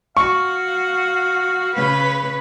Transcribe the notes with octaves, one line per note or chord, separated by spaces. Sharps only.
F#4 F5 C#6
C#3 B4